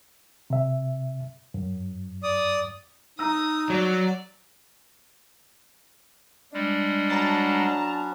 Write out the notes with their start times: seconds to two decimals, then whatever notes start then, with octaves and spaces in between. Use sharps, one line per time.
0.50 C3 E5
1.54 F#2
2.23 D5 D#6
3.19 D#4 A#5 D#6 E6
3.70 F#3 D5
6.53 G3 G#3 D4
7.10 F#3 B3 C#4 A5 A#5